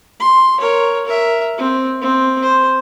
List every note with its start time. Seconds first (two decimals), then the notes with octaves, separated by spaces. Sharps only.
0.20 C6
0.59 A#4 C#5
1.05 A#4 E5
1.58 C4
2.01 C4
2.42 C5